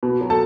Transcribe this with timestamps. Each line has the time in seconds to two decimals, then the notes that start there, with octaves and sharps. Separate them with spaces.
0.03 B2
0.21 F#3
0.30 A4 A5